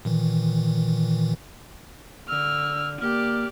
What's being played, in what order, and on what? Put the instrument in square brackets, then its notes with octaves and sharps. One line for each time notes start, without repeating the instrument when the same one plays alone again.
[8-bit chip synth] A#2 D#3 E3
[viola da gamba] D3 [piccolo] E6 [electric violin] F6
[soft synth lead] A#3 [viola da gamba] G4 [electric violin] D5 [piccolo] F6